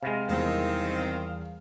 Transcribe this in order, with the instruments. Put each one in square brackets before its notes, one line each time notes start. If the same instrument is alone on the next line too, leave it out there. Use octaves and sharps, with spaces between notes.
[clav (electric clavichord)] C3 G#3 [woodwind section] F5 [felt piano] B5 A#6
[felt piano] E2 E3 G3 [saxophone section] D#3 C4